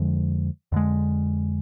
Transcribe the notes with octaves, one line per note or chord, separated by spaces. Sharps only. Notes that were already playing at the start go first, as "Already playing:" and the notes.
Already playing: F2 D3 F3 G#3
F2 D3 G#3